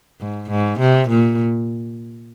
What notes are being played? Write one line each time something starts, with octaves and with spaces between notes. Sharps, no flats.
G#2
G#2
C3
A#2